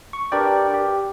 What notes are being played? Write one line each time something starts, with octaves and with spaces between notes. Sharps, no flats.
C#6
D4 G4 A#4 B4 D5 G5
G4